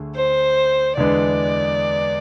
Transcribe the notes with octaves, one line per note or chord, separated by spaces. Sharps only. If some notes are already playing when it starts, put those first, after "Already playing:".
Already playing: D2 D3 A3 G#4
C5
E2 D3 G#3 B3 D5